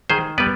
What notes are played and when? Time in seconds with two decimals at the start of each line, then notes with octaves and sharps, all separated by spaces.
0.10 D#3 G#4 C5
0.38 G3 B3 B4 D5